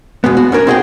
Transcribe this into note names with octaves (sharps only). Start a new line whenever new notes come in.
B2 G#3 B3
F#4
C#4 D4 A#4 C#5
C4 D#4 F#4 G#4 D#5 G5